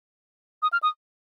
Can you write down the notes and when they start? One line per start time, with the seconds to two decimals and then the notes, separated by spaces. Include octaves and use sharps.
0.62 D#6
0.73 F6
0.83 D#6